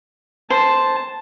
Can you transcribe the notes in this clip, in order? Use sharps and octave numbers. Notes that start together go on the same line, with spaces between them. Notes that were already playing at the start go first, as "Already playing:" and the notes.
C5 A5